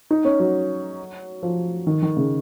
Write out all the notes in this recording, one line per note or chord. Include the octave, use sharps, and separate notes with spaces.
D#4
C#4
F#3
F3
D#3
D#3
C#3